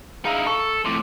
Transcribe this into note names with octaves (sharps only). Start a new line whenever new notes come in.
D#4 E4 G#4 F5 A#5
A4 C#6
F2 A2 C6 D6